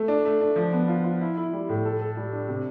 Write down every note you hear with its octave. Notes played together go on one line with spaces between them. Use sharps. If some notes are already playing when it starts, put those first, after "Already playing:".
Already playing: A3
D4
A3
D4
F3
B3
F4
F4
E4
E4
G3
A2
A4
A4
G3
D4
C3